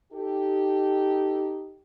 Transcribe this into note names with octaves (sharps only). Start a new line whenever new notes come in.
D#4 G4 A4